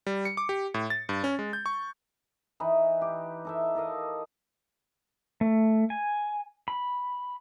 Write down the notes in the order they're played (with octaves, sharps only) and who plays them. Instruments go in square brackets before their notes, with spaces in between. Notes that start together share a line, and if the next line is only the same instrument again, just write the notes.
[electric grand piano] G3
C#7
D6
G4
A2
A6
G2
C#4
G#3
G6
C#6
[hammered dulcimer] E3 D#4 B4
G4
D#4 A4 E5
A4 A#4 D#5 F5
[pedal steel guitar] A3
G#5
B5